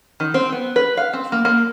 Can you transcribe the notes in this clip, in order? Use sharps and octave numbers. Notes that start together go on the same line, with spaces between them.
D#3
C4
B3
B4
F5
C4
A#3
A#3